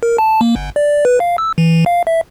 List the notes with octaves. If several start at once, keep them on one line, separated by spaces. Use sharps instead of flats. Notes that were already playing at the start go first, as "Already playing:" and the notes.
A#4
A5
A#3
G1
D5
B4
F5
E6
E3
F5
E5